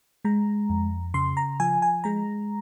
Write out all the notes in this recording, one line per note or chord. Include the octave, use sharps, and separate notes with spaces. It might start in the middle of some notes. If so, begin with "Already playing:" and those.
G#3 A#5
F2
C#3 C6
A#5
F3 G#5
G#5
G#3 A#5